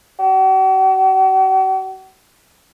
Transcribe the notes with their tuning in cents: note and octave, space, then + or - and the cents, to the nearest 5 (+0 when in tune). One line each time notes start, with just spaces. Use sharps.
F#4 +45